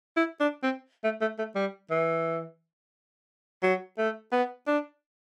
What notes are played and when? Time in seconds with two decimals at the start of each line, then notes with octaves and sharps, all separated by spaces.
0.17 E4
0.40 D4
0.63 C4
1.04 A3
1.21 A3
1.38 A3
1.55 G3
1.91 E3
3.63 F#3
3.98 A3
4.32 B3
4.67 D4